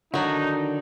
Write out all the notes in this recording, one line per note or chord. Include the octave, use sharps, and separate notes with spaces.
D3 D#3 F#3 D4 D#4 F#4